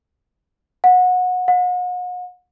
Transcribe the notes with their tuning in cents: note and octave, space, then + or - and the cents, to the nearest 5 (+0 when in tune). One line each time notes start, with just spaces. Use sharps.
F#5 -25
F#5 -40